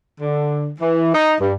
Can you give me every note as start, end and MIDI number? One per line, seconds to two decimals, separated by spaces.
0.21 0.71 50
0.80 1.11 52
1.14 1.33 63
1.41 1.54 43